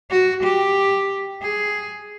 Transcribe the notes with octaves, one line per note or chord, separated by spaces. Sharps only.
F#4
G4
G#4